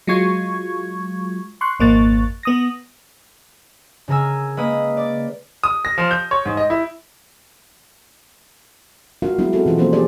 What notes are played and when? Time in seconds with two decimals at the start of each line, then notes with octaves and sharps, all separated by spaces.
0.07 F#3 G#3 F4 C#6 G#6
1.61 C6 C#6 F#6
1.80 G#1 F2 A#3 C#6 F#6 A6
2.43 B3 D#6 A#6
4.08 C#3 G#4 A#4 G#5 E6
4.57 G#3 A#3 B4 B5 D#6 D#7
4.97 D5 D6
5.63 D#6
5.85 A#6
5.98 F3
6.11 G6
6.31 C#5
6.46 G#2
6.57 D#5
6.70 E4
9.22 G#3 D4 F4 F#4 A#4 F5
9.38 F#3 G#3 B3 D4 E4
9.53 C4 F#4 G#4 A4
9.65 B2 E3 F4 B4
9.78 F3 A#3 B3 C#4 A4 C5
9.93 G4 G#4 D5